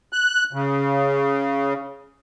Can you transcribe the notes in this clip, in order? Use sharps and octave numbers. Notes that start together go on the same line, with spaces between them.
F#6
C#3